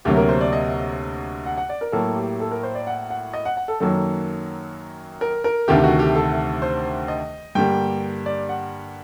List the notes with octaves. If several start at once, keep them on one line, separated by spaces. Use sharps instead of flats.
D2 C3 F#3 A#3 G4
A#4
C5
D5
D#5
F#5
F#5
D5
A#4
A2 F#3 A#3 A4
G4
A4
A#4
C5
D5
F#5
F#5
D#5
F#5
F#5
A4
F#2 D#3 F#3 A#3 A4
A#4
A#4
D2 C3 D#3 A3 G4
F#4
G4
A4
C5
D#5
G2 D3 G3 A#3 G5
D5
F#5